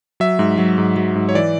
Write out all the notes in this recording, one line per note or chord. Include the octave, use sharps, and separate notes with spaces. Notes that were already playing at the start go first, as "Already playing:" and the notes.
F#3 E5
G#2
F#3
G#2
F#3
G#2
C#5
E3 D5